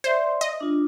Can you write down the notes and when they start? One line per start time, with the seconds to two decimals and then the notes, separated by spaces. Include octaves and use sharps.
0.04 C5 D5 E5 C6
0.41 D#5
0.61 D4 F4